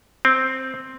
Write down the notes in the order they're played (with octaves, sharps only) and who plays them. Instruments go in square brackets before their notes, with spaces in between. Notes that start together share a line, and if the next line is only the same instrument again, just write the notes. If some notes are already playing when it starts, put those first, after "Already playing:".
[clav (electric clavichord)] C4